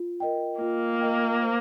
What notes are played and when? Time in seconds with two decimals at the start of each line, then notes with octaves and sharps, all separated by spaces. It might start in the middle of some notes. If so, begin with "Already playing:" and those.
Already playing: F4
0.20 A#4 D#5 G5
0.61 A#3 F4
1.01 A#4 D#5 G5
1.41 C5